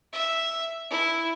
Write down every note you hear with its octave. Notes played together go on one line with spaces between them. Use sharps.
E5
E4